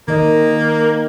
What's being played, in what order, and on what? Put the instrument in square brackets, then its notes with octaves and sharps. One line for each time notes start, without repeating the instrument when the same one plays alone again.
[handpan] D#3 D#5 [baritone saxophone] A#3